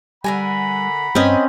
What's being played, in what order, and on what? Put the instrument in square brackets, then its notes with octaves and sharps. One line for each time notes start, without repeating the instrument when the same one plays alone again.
[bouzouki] D3 A#4 G#5 [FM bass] G3 [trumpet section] F#5 A#5 B5
[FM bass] G2 [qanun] C4 C#4 [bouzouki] B4 D#5